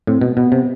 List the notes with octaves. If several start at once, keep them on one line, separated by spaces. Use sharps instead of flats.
A2 C4
B2
B2 B3
C3